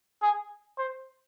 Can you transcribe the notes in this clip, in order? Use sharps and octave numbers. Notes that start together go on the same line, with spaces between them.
G#4
C5